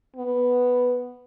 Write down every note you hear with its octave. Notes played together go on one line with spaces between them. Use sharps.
B3